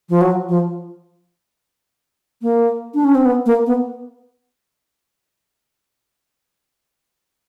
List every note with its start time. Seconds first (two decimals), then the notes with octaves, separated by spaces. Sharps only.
0.10 F3
0.21 F#3
0.49 F3
2.42 A#3
2.94 D4
3.04 C#4
3.15 C4
3.25 B3
3.46 A#3
3.66 B3